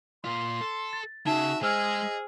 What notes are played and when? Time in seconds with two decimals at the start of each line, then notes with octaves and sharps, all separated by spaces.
0.25 A#2 F4 C6
0.61 A4
0.93 A6
1.26 C#3 D#4 F#4 G#4 E5 A5
1.63 G#3 G#4 C5 D#5 E6 F6